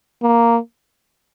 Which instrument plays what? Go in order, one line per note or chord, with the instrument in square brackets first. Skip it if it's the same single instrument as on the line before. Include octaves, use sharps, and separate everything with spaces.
[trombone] A#3